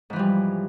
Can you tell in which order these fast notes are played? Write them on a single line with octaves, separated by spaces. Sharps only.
G#2 E3 F3 G3